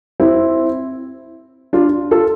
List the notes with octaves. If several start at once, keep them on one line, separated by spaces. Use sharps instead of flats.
C4 E4
D4 F4
F4 A4